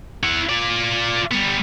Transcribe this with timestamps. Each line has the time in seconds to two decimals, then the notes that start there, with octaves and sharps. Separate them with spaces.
0.23 E4 F#5
0.49 F4 D5
1.31 G3 B3